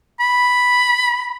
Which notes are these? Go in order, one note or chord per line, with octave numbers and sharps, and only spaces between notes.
B5